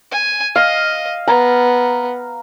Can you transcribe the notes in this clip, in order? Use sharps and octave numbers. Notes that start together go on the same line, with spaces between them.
G#5
D#5 F5
B3 A#5